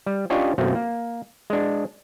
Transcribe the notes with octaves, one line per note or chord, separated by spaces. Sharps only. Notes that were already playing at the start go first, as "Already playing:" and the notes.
G3
C#4 D4 F4 G4 C#5 D#5
F#2 B2 A3 A#3 C4
A#3
G#3 D4